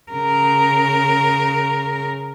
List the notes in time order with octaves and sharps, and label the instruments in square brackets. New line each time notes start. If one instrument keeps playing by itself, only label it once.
[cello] C#3 A#4